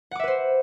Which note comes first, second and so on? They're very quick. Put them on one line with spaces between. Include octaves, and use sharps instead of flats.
F#5 D6 E5 B4 C5